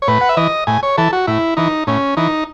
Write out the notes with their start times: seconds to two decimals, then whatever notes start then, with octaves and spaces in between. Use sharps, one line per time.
0.02 C#5
0.08 A2 B4
0.21 F#5
0.29 E5
0.37 E3 D#5
0.67 A2 G#5
0.83 C#5
0.98 E3 A4
1.13 F#4
1.27 A2 E4
1.57 E3 D#4
1.87 A2 C#4
2.17 E3 D#4